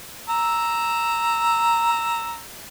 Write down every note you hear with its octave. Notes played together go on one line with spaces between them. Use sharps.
A#5 E6